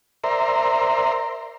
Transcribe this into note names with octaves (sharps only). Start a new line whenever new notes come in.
A#4 C5 D5 E5 A#5 C6